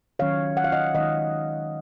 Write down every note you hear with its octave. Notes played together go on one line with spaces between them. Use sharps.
D#3 F#3 C#4 C#5 F5
F#5
F5
D#5 F#5
D#3 G#3 D#4 D#5 F#5